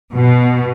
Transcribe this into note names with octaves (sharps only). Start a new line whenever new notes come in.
B2